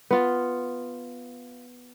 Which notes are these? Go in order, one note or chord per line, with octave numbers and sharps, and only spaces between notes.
B3 F4